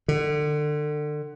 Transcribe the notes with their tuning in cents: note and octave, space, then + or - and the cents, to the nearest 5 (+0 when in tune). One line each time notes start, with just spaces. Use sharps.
D3 +30